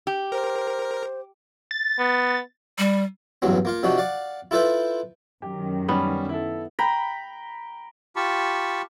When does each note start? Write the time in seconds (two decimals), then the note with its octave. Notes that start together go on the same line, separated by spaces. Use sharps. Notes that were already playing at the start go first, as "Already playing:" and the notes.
0.07 G4
0.32 A#4 C5
1.71 A6
1.99 B3
2.78 G3
3.42 A1 E2 G2 F#3 C4
3.65 A#3 F4 F5
3.83 C3 F3 D4 D#4 F#4
3.98 D5 F5 F#5
4.51 E4 F4 A4 B4 C5 E5
5.42 F#2 D#3 G4
5.88 G3 B3 C#4
6.29 E4 A4
6.79 G5 A#5 B5
8.16 F4 G4 A5 B5 C#6